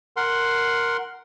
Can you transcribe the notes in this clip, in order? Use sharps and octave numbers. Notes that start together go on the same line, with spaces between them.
A#4 F#5 C6